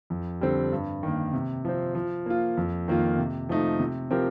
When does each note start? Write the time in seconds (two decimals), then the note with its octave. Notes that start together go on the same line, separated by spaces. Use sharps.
0.10 F2
0.41 D3 G3 C4
0.72 G2
1.03 D#3 A#3
1.33 C3
1.65 F3 C4
1.95 F3
2.26 A#3 F4
2.57 F2
2.88 D#3 A#3 F4
3.18 C3
3.49 F3 A3 D#4
3.80 C3
4.11 F3 C4 G4 A#4